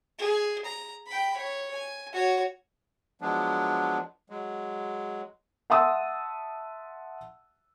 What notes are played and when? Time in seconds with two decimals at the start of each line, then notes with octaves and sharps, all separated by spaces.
0.19 G#4
0.65 A#5
1.07 G5 B5
1.37 C#5
1.73 G#5
2.13 F#4 C#5
3.21 F3 F#3 G#3 B3 D4
4.30 F#3 G#3
5.70 E5 F#5 A5 C6 D#6 E6